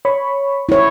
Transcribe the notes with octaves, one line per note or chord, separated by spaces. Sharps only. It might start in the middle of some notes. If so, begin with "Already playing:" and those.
C#5 B5 C#6
E4 C#5